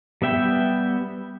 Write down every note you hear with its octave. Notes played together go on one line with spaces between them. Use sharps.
G3 B3 E5 G5